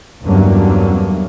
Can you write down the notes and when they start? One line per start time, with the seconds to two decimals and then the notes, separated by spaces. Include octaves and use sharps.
0.24 E2 G2 D3 F#3 A#3 C#4